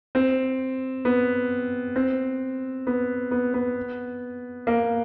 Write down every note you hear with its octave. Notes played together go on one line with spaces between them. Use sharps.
C4
B3
C4
B3
B3
B3
A#3